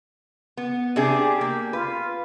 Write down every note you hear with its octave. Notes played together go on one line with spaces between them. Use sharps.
B3
C3 D4 G4 G#4
A#3
F4 B4